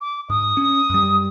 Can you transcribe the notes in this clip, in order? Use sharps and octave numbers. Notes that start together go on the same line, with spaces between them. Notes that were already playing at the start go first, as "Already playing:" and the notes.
D6
G#2 D#6
C#4
F#2 G3